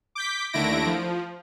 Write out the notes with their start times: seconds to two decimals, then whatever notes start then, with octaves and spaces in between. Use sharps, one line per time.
0.15 D6 G6 B6
0.53 D#2 D3 A3 E4 A#6 D7
0.86 F3